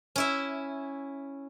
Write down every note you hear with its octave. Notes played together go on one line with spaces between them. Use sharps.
C#4 E4 E5